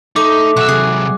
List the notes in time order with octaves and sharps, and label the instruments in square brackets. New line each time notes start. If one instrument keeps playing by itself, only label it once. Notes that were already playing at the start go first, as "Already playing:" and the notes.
[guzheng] A3 [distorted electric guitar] D#4 [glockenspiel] D6
[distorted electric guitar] B1 E5 [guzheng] F#4
[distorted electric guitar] C3 F#3 [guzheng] G#4